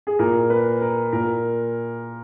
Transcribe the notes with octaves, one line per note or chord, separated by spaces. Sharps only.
G#4
A#2 A#4
B4
A#4
A#2 A#4